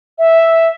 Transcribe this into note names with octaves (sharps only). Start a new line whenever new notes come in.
E5